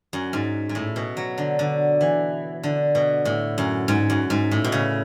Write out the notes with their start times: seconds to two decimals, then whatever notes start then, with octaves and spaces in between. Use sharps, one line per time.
0.13 F#2
0.33 G#2
0.69 G#2
0.75 A2
0.96 B2
1.17 F#3
1.38 D3
1.59 D3
2.01 E3
2.63 D3
2.95 B2
3.25 A2
3.58 F#2
3.88 G#2
4.10 F#2
4.30 G#2
4.51 A2
4.64 B2
4.72 C#3